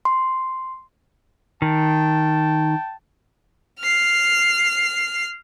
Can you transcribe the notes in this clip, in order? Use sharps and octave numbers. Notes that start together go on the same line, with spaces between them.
C6
D#3 G5 A5
F6 C7